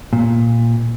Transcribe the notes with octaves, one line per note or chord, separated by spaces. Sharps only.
A#2